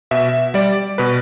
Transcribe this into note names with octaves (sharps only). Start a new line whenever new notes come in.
B2 E5
G3 D5
B2 B4